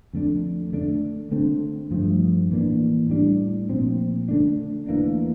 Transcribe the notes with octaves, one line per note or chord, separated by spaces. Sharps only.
F2 D3 A3 D4
D3 A3 D4
D3 A3 C4
G2 F3 A3
A2 E3 A#3 D4
A2 G3 D4
A#2 F3 C4
D3 A3 D4
E2 E3 A#3 D4